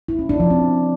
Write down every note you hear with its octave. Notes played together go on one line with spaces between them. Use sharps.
E4
C#4
D4
F3
C4